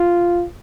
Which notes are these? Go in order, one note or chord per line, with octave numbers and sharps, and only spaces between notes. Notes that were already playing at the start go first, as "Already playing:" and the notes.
Already playing: F4